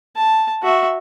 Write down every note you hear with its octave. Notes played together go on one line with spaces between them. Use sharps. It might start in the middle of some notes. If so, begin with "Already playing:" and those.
A5
F#4 E5